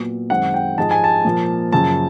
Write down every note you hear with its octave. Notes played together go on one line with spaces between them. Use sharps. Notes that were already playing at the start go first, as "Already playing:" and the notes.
Already playing: A#2 F#3 B3
F#2 D#3 G#3 C4 F#5
G5
G#2 F3 G#3 A5
G#5
A5
A#2 F3 A#3
F#2 C#3 F3 A5